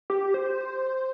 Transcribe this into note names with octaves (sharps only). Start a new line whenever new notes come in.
G4
C5